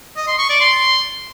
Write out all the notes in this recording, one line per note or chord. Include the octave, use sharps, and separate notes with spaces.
D#5
C6
C#6
D5
C6